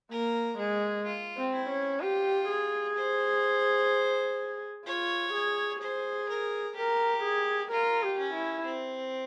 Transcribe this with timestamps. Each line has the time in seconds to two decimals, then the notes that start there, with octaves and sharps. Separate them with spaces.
0.11 A#3 A#4
0.58 G#3 G#4
1.06 F4
1.38 C4
1.54 E4
1.70 C#4
2.01 F4 G4
2.49 G#4
2.96 C5
4.86 F4 C#5
5.33 G#4
5.81 G#4 C5
6.29 A#4
6.76 G4 A#4
7.24 G#4
7.71 F4 A#4
8.03 G4
8.19 C#4
8.34 E4
8.66 C4